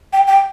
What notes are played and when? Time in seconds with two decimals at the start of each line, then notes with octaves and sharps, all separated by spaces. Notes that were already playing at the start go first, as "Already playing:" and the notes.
0.13 G5
0.27 G5